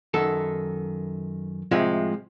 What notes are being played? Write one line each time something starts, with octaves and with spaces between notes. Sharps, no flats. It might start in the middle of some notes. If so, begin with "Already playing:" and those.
F#2 D#3 A4
A2 C3 F3 G#3